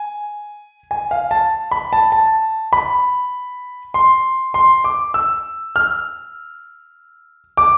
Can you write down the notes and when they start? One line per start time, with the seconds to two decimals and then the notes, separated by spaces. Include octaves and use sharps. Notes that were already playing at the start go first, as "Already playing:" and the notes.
Already playing: G#5
0.91 G#5
1.11 F5
1.31 A5
1.71 B5
1.93 A5
2.12 A5
2.73 B5
3.94 C6
4.54 C6
4.84 D6
5.14 E6
5.76 F6
7.57 D6